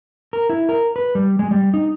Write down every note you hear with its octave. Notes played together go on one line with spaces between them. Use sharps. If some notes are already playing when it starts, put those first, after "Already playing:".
A#4
E4
A#4
B4
G3
G#3
G3
D#4